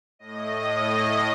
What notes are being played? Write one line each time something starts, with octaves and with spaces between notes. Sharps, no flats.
A2 D#5